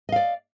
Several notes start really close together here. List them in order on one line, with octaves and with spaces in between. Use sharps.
D#5 F5 D5